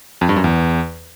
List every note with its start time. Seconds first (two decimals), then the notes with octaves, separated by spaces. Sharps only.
0.21 F2
0.29 G2
0.36 F#2
0.44 E2